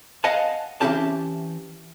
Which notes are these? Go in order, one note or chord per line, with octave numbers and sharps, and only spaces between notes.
D#5 F5 F#5 G#5 A5
E3 F#3 C4 C#4 G4 A5